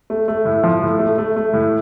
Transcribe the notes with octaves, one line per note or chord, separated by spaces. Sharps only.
A3
A3
A2
F3
A2
A3
A3
A3
A2